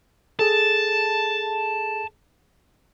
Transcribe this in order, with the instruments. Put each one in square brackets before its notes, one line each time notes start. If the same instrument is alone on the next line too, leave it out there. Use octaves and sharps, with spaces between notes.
[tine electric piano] G#4 A4 [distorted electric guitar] A5